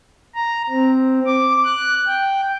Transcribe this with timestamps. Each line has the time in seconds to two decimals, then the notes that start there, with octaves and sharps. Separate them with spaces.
0.35 A#5
0.69 C4
1.26 D6
1.64 F#6
2.07 G5